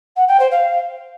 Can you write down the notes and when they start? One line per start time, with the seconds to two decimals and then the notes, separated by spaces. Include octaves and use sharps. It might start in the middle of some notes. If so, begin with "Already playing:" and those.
0.16 F#5
0.28 G5
0.39 C5
0.51 F5